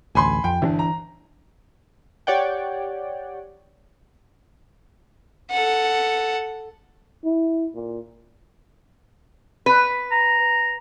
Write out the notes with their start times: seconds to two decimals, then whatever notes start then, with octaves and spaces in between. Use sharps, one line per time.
0.15 A1 D2 G#5 B5 C6
0.44 F2 G5
0.62 G1 E3 B3 D4
0.79 A#5
2.27 G4 C#5 D5 F#5 G5
5.51 A4 F#5
7.24 E4
7.75 A#2
9.66 B4
10.11 A#5